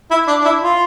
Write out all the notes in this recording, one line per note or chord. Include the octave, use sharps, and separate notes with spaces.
E4
D4
D4
E4
F4